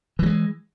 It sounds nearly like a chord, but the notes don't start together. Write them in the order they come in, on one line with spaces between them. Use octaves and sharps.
E3 F#3 G#3